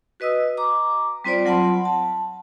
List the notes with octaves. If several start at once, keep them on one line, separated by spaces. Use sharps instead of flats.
F#4 B4 D#5 D#6 E6
A#5 D6
G3 C4 F4 C5 D5
F#3 F4 F#5 A5 B5 C6
A5